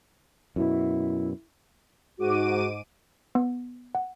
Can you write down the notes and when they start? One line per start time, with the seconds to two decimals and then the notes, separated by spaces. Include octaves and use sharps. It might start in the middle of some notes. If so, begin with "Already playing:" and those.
0.56 F#2 B2 E4
2.19 G#2 F#4 D6 D#7
3.35 B3
3.95 F#5